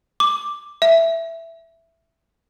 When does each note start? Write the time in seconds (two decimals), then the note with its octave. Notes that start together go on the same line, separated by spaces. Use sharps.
0.20 D6
0.82 E5